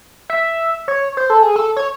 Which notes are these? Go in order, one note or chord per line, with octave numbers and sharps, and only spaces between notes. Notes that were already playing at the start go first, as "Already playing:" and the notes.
E5
C#5
C5
A4
G#4
A4
C#5